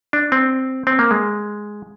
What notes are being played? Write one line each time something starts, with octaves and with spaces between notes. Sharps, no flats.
D4
C4
C4
A#3
G#3